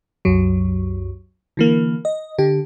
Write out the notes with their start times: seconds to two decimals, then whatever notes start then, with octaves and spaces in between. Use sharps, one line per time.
0.25 C2 F#2 F#3
1.57 D3 E3 A#3
2.05 D#5
2.38 D3 G4